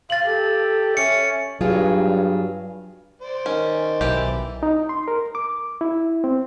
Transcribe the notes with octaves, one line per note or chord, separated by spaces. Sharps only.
F5 A6 F#7
G4 A4
C#4 E5 C#7
G2 F#3 F4 G#4
C5 D5
D#3 C#4
B1 E3 G4
D#4
C6
A#4
D6
E4
C4